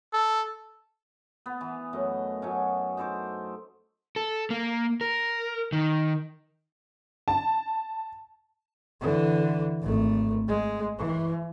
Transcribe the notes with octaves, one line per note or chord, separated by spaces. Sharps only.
A4
B3
E3
F#2 A3 D#5
F#3 A3 C#4
D#4 A4 C5 D6
A4
A#3
A#4
D#3
A5
D3 E3
G#1 A3
G#3
E3